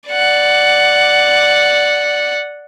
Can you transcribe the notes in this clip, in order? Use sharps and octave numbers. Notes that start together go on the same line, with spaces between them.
D5 F#5